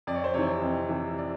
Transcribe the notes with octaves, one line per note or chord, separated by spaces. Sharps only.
F2 D5
C#5
C5
C3 E3 C#5
F2
C3 E3
D5